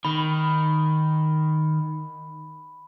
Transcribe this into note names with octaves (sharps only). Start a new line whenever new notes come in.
D#3 B5